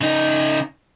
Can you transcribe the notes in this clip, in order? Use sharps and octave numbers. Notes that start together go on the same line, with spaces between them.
C#3 D#4